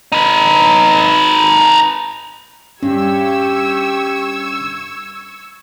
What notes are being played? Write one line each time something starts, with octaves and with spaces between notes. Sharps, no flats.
D#4 B4
G2 C#4 G4 C#6 E6 G#6